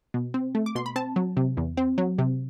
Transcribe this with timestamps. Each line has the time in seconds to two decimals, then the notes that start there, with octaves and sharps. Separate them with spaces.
0.14 B2
0.34 C4
0.55 A3
0.66 D6
0.75 B2 C6
0.86 B5
0.96 C4 A5
1.16 F#3
1.37 C3
1.57 E2
1.77 C4
1.98 F#3
2.18 C3